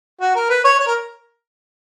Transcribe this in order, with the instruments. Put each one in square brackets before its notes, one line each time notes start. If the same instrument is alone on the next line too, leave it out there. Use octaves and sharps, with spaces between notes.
[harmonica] F#4
A#4
B4
C#5
C#5
A#4